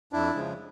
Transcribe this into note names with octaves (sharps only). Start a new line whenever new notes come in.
F2 D4 E4
C#3 F3 G#3